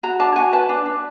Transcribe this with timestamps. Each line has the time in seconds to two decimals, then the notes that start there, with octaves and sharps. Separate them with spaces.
0.03 F#4 A#5
0.20 D4 A5
0.36 F#4 G#5
0.52 B4 A5
0.69 D4
0.86 D4